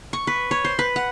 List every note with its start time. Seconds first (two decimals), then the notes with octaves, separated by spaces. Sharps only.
0.13 C#6
0.27 B4
0.51 C#5
0.65 C5
0.79 B4
0.96 F#5